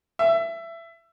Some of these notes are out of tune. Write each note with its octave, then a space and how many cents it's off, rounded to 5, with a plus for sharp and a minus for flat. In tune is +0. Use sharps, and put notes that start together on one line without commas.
E5 +20